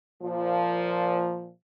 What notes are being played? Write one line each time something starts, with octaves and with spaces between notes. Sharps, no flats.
A#2 F3